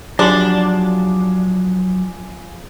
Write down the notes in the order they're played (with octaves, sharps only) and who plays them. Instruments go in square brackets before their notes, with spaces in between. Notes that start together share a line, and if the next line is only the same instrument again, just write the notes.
[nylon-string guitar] F3 G4 [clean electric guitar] F#3 F#5 [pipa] D4 [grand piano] G#4 C6 D6